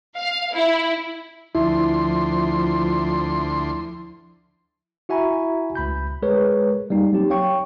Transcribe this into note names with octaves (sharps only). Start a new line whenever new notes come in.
F5
E4
D2 F3 E4 C6
E4 F#4 E5 G#5 A#5 B5
C#2 B5 G6
G#3 G#4 A#4 B4 C#5
G3 A#3 D#4
F#3 C4 D#4 G4
C#5 F5 G5 C#6